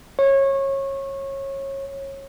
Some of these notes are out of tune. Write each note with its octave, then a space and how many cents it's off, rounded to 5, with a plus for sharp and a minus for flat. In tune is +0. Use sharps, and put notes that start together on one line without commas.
C#5 -25